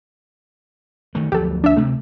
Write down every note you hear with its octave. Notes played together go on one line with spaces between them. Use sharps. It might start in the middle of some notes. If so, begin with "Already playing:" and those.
D#3 A3
D2 F3 F#3 G4 A4
D4 E5
D2 C3 A3